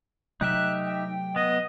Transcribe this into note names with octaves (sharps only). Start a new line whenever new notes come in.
C3 F#3 A3 D#4 G4 E5 F#6
G5
B3 D#5